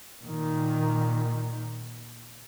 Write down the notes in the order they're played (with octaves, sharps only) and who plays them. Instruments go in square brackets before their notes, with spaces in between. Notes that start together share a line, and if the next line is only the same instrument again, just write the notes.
[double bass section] A#2 D#3